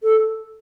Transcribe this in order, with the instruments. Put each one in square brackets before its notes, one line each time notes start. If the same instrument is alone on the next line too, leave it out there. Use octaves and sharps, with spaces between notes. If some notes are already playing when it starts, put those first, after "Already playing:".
[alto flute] A4